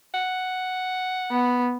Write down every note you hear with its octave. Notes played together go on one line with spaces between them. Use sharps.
F#5
B3